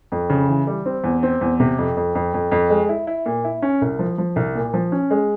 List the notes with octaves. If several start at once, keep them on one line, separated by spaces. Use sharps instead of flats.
F2
C#3
E3
G3
C4
E2
C4
E2
C3
F2
F2
F2
F2
F2
G#3
E4
E4
A#2
E4
C#4
C2
F3
F3
C2
A#2
F3
C#4
G#3